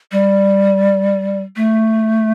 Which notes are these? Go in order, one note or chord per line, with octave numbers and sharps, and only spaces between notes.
G3
A3